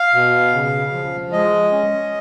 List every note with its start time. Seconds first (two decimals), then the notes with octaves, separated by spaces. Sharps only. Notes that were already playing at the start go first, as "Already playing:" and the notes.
Already playing: F5
0.15 B2
0.54 C#3
0.93 F3
1.32 G#3 D#5
1.72 C#4